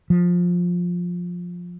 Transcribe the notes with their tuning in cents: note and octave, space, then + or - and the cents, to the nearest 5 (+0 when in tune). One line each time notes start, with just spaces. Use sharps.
F3 +15